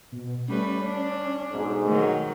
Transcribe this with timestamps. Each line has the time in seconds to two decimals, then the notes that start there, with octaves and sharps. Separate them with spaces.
0.12 B2
0.48 G3 A3 C#4 B4
0.84 D4
1.52 B1 G#2
1.85 D#3 F#3 A3